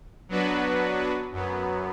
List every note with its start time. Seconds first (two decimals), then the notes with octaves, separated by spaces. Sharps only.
0.29 F#3 B3 D4 F#4 B4
1.32 F#2 F#3 B3